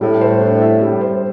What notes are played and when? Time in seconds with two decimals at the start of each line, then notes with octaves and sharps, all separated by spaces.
0.01 A2 G3
0.21 C5
0.41 D4
0.62 E5
0.81 G3
1.01 C5